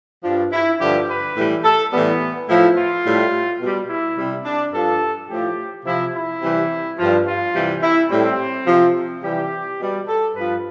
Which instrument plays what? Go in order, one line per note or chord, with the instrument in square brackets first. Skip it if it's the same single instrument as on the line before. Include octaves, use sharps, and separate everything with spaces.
[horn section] G2 F3 D4
E4
G2 D3 F3 G4
B4
A2 E3 G3
A4
A2 E3 G3 B3
A2 F3 E4
F4
A2 G3
B2 G3
E4
C3 G3
D4
G2 F3 A4
A2 F3 G4
C3 F3 E4
E4
C3 E3 G3
G2 F3
F4
C3 E3 G3
E4
A2 G3 C4
C3 F3
C3 E3 G3 G4
B2 G3
A4
G2 F3 B4